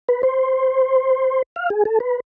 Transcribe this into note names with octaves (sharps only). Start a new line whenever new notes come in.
B4
C5
F5
G#4
A4
B4